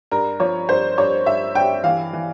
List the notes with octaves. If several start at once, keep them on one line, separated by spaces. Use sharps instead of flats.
G2 A#4
F3 C#5
G2 C5
G2 C#5
G2 E5
G2 G5
E3 F5
E3